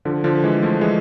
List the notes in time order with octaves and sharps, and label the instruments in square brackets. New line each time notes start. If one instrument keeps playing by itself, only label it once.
[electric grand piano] D3 F3
D3 F3
E3 G#3
F3 A3
E3 G#3